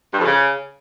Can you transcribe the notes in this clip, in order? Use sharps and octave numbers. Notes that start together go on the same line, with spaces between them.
G2
F2
C#3